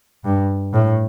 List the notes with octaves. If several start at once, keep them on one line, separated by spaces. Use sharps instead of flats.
G2
A2